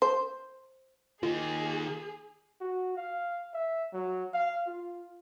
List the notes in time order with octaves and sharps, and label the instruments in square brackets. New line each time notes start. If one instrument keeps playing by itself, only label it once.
[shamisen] C5
[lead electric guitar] D#3 A#3 [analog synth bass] F4 [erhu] G#4
[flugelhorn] F#4
F5
E5
F#3
F5
F4